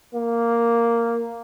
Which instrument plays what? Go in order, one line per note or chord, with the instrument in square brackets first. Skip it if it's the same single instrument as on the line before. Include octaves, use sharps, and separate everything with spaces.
[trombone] A#3